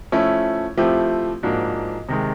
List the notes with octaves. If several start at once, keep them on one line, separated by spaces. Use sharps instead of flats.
F3 A3 C#4 E4
F3 A3 C4 E4 G4
G#2 F3 A#3 D4 F#4
C3 D#3 G#3